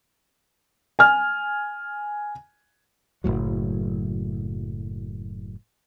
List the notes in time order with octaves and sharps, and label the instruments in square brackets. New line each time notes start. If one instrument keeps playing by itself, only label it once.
[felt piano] G#5 F6
[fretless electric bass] F#1 D#2 A2 F#3